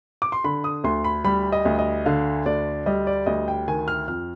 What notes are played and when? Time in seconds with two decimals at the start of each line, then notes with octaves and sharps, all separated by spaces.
0.22 D6
0.32 C6
0.44 D3 B5
0.64 D#6
0.84 D2 C6
1.04 B5
1.25 G3 B5
1.52 D#5
1.65 D2
1.79 D#5
2.06 D3 F5
2.46 D2 D5
2.86 G3 D#5
3.07 D5
3.26 D2 D#5
3.48 G5
3.68 D#3 G#5
3.88 F6
4.08 F2 F6